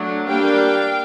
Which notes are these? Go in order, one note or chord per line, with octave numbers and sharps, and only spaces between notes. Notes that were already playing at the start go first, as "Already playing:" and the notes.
Already playing: F#3 A3 D4
G3 A#3 D4 F5 G5